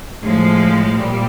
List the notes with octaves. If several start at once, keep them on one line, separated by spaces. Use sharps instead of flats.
A2 F3 G#3
A#2 G3